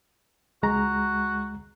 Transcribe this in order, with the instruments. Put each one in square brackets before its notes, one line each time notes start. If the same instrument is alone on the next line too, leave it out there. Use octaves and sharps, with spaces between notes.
[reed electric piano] C#2 G#3 A#5 [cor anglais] F#4